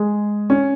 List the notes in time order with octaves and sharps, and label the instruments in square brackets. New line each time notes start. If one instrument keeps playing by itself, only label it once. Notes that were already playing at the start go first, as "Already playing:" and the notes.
Already playing: [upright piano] G#3 G#4
C#4